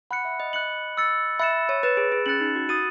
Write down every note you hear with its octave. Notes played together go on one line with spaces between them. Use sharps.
F#5 B5 F#6 C#7
E5
D#5
F#6 C#7 F#7
E6 A6 C#7
E5 B5 F#6 A6 C#7 E7
C#5
B4 F#6 A6 E7
G#4
G#4
C#4 F#6 A6 C#7 F#7
D#4
F#4
F#4 D#6 A6 D#7